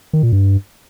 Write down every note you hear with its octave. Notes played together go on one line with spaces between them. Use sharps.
D#3
A#2
G2